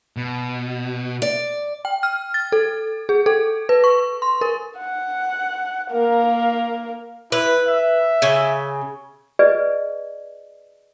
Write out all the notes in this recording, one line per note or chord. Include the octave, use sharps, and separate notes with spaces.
B2
D5
G5
F6
A6
A4
G#4
A4
B4
C#6
C6
A#4
F#5
A#3 A#4
E4 B4
E5
C#3 G#5
G#4 B4 D5 D#5